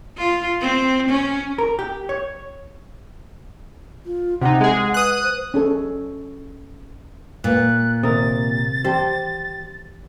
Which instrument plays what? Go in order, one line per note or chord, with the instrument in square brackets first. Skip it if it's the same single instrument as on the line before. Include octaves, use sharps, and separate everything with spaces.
[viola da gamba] F4
C4
C#4
[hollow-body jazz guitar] A#4
G4
C#5
[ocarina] F4
[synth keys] C3 D#4 [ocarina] F#5
[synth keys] G#3 G#4
[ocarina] B4 [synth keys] D#6 F#6
[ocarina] C5
[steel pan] C#4 G#4 A4
[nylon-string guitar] A#2 [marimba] G#3 B4 [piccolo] F#6
[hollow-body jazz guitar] C3 A#4 [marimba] D#3 D#6 [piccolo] A6
[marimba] E3 A5 C6 [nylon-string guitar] G4 [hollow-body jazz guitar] C5